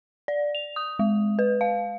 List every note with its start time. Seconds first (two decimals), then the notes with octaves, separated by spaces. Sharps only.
0.28 D5
0.55 F7
0.76 D#6
0.99 G#3
1.39 B4
1.61 F5